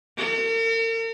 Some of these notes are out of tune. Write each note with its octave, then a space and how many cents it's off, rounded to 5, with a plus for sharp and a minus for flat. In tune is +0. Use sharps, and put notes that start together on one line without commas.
A#4 -45